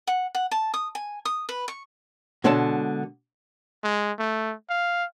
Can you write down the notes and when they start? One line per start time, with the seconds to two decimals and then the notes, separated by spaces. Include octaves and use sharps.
0.07 F#5
0.35 F#5
0.51 A5
0.74 D#6
0.95 G#5
1.25 D#6
1.49 B4
1.68 C#6
2.44 B2 D3 G#3 C#5 A5
3.84 G#3
4.19 A3
4.70 F5